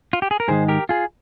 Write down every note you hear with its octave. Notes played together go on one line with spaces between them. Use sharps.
F4
G4
G#4
A#4
G#2 D#3 G#3 G#4 C5
G4 A#4
F4 G#4